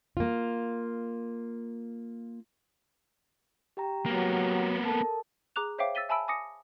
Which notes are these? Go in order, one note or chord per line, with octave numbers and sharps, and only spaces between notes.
A#3 F4
G4 G5 A#5
F#3 A#3 B3
A4 A#4 A5
G#4 A#5 D6 F#6 F7
C5 C#5 E5 F5 G5 D6
E6 A6 B6 D#7 G7
E5 G#5 A5 B5 E6 D7
G#5 D6 D#6 A#6 C#7